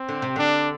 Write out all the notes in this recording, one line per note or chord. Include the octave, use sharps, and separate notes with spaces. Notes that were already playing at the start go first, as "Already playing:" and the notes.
Already playing: C4
D3
C3
D3 D4